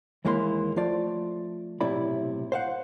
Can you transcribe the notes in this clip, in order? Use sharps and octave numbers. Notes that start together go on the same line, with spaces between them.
D#2 E3 G#3 A#3 E4 C6
F3 A3 F4 D5
B1 A2 C3 E4 D5 B5
C5 F5 F#5